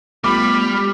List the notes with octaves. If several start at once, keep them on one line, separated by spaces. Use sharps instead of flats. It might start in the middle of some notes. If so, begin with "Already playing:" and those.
G3 A3 B3 F4 B5 D6 F6